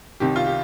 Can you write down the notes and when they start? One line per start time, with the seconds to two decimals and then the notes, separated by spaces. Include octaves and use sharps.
0.20 C2 C3 D#3 G4
0.36 F4
0.47 G4